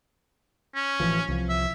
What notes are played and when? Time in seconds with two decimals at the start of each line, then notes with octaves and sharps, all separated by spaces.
0.75 C#4
1.00 A1 E3 F3
1.29 C2 F3
1.49 E5